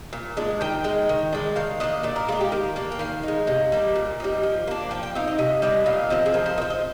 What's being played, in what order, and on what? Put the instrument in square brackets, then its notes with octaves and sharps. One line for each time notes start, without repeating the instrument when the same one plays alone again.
[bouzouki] A#2
G#3 D4
D#3 G5
G#3 D#4
D#3
G#3 D4
D#3 F5
A#3 D4 D#5
A#2 D5
A#4
G#3 D4 F4
G4
D#3 A#4
A#3 D4
G5
D#3 F5
G#3 D#4
C3 D#5
G3 A#3 D4
A#2
G3 C4 D#4
F3
A#3 D4
F3 G5
G5
C4 D#4 F5
D#5
C3 D#5
G3 D4 D#5
A#2 F5
F3 C4 D#5
G#4
F3 A#4
C5
D#4
C4
D#5